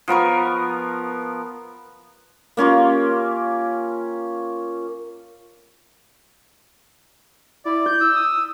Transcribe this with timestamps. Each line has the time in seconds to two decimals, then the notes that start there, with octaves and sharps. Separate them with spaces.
0.08 F3 B3 A#4 C#6
2.57 A#3 C#4 F4 G4
7.65 E4 D5
7.86 G6
8.01 E6
8.15 D#6